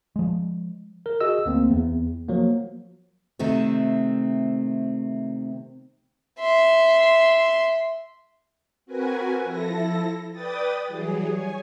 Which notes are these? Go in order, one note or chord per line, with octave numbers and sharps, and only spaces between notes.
F3 G#3
A#4
F#4 G#4 D#5 E6
D2 A#3 C4
E2
F3 F#3 A#3
C3 D#3 A3 C4
E5 C6
C4 F#4 A#4 B4 G#5
F3 E4 A4 A#6
B4 D5 G5 D#6 A6
E3 F#3 G3 G#4
C#5 G#5